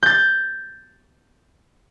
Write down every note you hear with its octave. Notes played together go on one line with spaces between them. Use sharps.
G6 A6